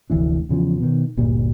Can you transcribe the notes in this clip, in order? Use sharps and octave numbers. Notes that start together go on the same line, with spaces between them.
F1 D2 E3 D4
E2 C#3 F3
B2 D#3
G1 D2 A#2 G3